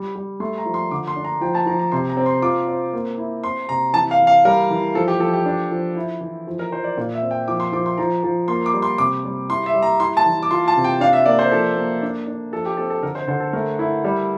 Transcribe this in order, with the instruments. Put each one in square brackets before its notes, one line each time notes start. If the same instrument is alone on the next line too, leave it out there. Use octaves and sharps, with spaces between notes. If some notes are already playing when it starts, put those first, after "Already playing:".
Already playing: [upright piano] G3
G3
[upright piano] A3 [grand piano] C6
[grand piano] A#5
[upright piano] F3
[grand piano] C6
[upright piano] D3 [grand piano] D6
[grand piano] C6
[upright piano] D4
[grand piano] A#5
[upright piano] F3 [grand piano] G5
[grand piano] A5
[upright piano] F3 [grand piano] A#5
[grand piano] A#5
[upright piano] C3 [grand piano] C6
[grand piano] A#5
[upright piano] C4
[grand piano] C6
[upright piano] F4 [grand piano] D6
[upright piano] C4
A#3
E4
[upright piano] C4 [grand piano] C6
[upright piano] C3 [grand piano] A#5
[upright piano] E3 [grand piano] A5
[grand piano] F5
[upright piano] E3
[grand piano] F5
[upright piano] G3 [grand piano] A#4
[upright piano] E3
[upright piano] F3 [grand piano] A4
[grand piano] G4
[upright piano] F3 [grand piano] A4
[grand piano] G4
[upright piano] D4
F3
E4
E3
F3
[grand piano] A#4
[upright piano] F3 [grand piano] C5
[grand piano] D5
[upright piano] A#2 [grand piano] D5
[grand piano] E5
[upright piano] C4
[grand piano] G5
[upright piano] F3 [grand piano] D6
[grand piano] C6
[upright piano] F3 [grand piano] D6
[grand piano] C6
[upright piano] F3 [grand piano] A#5
[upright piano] F3
[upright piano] A#3 [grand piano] C6
[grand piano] D6
[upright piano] G3
[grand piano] C6
[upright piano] C3 [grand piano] D6
[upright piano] G3
[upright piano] E4 [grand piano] C6
[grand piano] E5
[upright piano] G3
[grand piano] A#5
[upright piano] E4 [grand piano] C6
[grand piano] A5
[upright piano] E3
[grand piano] D6
[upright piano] F4 [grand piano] C6
[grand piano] A5
[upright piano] C3
[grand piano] G5
[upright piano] D4 [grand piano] F5
[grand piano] E5
[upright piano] A#3 [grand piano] D5
[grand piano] C5
[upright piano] F3 [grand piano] A4
[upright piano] A#3
D4
D4
[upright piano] F3 [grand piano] A4
[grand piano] G4
[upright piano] C4 [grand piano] A4
[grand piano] A4
[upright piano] D3 [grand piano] A#4
[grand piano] C5
[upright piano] D3 [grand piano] C5
[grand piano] A4
[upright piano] A3 [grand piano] A#4
[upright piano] E4
G3